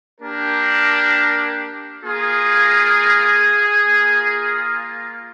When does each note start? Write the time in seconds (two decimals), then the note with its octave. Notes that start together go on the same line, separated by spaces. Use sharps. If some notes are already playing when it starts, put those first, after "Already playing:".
0.21 A#3 D4 G4 A#4
2.03 A#3 F4 G#4
3.85 A#3 F4